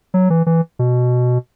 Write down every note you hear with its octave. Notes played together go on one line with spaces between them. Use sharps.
F#3
E3
E3
B2